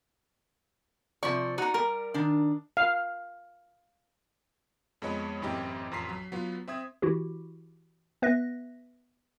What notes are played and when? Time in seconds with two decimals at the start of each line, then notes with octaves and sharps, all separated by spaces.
1.23 C3 F3 D5 C#6
1.58 D#4 F#4 A#5
1.74 G3 A#4
2.14 D#3 D4
2.77 F5
5.02 F2 G#3 B3 C#5 D#5 B5
5.42 A1 F#2 C4 E4 G4 D#5
5.91 A1 F2 A#5 C6 B6 C7
6.09 F#3
6.32 F#3 B3 F4
6.68 C4 E5 D#6 G#6
7.02 E3 E4 F#4 G4
8.22 B3 B4 E5 F#6 A#6